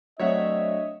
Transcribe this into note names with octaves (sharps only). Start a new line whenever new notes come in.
F#3 A3 C4 D4 C#5 D#5 E5 F#5